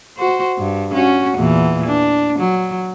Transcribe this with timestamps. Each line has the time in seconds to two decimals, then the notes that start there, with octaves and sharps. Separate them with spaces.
0.18 F#4 C5
0.58 G2
0.94 C#4 F#4
1.36 E2 A#2 E3
1.86 D4
2.39 F#3